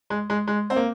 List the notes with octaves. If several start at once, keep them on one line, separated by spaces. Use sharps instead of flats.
G#3
G#3
G#3
C4
A#3